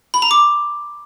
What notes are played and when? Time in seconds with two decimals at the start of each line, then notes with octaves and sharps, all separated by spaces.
0.14 B5
0.22 A#5
0.31 D6